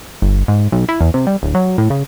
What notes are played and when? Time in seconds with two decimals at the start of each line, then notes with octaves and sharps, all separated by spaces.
0.22 G1
0.48 G#2
0.72 B1
0.89 E4
1.01 E2
1.14 C3
1.27 G3
1.43 D1
1.54 F#3
1.78 A2
1.90 C#3